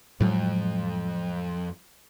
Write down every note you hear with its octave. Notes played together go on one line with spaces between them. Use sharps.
F2 A2 F#3 G#3